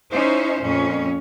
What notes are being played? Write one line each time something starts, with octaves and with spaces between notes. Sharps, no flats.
C#4 D#4 E4 C5
F2 A#2 C#4